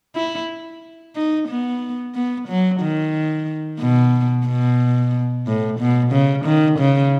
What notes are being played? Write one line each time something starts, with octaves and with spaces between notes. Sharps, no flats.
E4
D#4
B3
B3
F#3
D#3
B2
B2
A2
B2
C#3
D#3
C#3